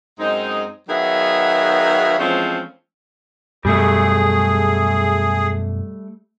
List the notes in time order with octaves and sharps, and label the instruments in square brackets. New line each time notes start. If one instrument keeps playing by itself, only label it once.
[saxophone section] F#2 G#3 C4 D#4
D#3 F#3 B3 G#4 E5 F5
E3 F3 G#3 A3 C4 C#4
[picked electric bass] F#2 B2 [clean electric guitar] G3 A3 [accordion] G#4